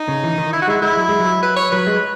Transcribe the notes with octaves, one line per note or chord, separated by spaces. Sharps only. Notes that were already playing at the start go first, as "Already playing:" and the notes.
Already playing: D#4
C#3
E3
D#3
E4
F#4
G#3 E4
G#3 E4
F#3
G#3
F#3
B4
C#5
F#3 B4
G#3